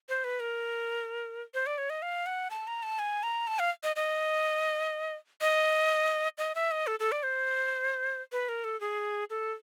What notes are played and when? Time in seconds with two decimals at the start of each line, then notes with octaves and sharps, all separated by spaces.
0.09 C5
0.24 B4
0.40 A#4
1.54 C5
1.66 D5
1.78 C#5
1.90 D#5
2.02 F5
2.26 F#5
2.51 A5
2.67 A#5
2.83 A5
2.99 G#5
3.23 A#5
3.47 A5
3.59 F5
3.83 D#5
3.96 D#5
5.41 D#5
6.38 D#5
6.55 E5
6.71 D#5
6.87 A4
7.00 A4
7.12 D5
7.23 C5
8.32 B4
8.49 A#4
8.64 A4
8.81 G#4
9.30 A4